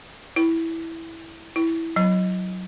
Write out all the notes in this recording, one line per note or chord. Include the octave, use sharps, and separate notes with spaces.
E4
E4
F#3